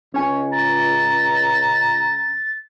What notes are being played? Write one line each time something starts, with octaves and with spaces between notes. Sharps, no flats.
C#2 C#4 C#5 G#5
A#5 A6